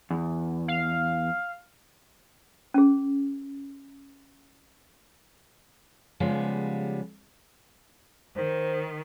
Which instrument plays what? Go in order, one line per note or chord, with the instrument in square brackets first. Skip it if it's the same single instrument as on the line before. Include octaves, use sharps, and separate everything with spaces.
[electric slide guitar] E2
[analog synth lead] F5
[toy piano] C#4 G#4
[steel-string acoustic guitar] C#3 F3 G3 G#3 B3
[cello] D#3 [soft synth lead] C5